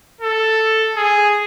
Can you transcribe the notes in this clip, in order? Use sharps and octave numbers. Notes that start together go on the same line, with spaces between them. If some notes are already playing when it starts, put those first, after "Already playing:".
A4
G#4